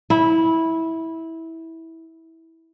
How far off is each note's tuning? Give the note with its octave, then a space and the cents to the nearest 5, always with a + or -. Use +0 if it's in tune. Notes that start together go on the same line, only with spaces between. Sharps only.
E4 -15